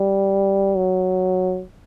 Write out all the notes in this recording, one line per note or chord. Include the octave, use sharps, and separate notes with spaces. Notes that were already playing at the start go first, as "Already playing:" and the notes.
Already playing: G3
F#3